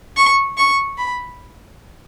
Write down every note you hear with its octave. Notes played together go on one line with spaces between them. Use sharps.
C#6
C#6
B5